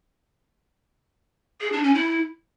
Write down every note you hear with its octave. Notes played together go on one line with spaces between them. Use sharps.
G#4
D4
C#4
E4